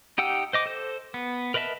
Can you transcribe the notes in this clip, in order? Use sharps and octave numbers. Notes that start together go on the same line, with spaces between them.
D#4 G4 F#5 G5 E6
C5 D#5 D6
A4 C5
B3
A#4 B4 D#5 E5 A5